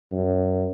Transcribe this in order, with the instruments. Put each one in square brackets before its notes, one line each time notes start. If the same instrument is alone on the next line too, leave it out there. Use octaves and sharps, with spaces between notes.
[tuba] F#2